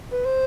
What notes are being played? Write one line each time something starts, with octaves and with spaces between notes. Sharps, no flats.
B4
C5